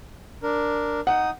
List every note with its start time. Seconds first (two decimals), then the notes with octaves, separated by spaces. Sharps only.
0.43 D4 A#4
1.07 D#4 F#5 D#6